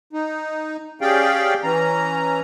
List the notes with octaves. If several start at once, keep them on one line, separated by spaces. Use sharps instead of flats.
D#4
C#4 G4 G#4 D5 F5 G5
E3 C#4 A#5